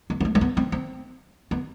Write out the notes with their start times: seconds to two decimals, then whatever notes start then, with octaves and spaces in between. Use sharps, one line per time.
0.10 B3
0.20 B3
0.25 A3
0.35 A3
0.41 B3
0.57 C4
0.72 C4
1.51 B3